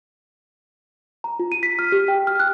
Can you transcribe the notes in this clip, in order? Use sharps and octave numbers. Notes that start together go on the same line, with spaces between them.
A#5
F4
D#7
B6
F6
G4
G5
F6
F#6